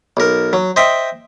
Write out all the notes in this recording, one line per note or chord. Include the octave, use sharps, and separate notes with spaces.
B1 A#4
F#3
C5 D#5 E5 G5